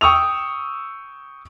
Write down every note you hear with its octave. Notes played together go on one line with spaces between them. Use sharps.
G5 C#6 D#6 E6 F7